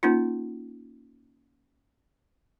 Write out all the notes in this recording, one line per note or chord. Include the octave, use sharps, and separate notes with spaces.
A#3 C#4 D#4 F4